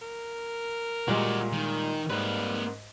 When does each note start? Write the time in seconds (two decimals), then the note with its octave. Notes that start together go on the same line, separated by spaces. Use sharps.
0.02 A#4
1.08 A#2 G3 G#3 F#4 D5
1.52 D#3
2.10 G#2 G3 A#3 B4